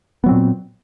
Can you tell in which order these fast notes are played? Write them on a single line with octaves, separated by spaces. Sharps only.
B3 F#3 C4 A#2